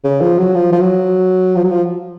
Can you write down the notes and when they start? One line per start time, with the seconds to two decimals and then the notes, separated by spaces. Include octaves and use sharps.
0.04 C#3
0.21 F3
0.38 F#3
0.55 F3
0.72 F3
0.81 F#3
1.56 F3
1.64 F#3
1.71 F3